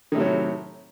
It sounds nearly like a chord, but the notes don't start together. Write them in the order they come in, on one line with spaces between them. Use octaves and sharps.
D#3 A2 C3 F#3